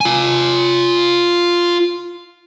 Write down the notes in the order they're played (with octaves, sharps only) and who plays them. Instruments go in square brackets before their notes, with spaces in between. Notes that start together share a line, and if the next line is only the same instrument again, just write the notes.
[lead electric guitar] F4 G#5